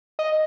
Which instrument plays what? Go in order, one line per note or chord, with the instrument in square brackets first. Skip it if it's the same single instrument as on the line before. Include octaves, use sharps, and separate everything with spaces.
[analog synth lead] D#5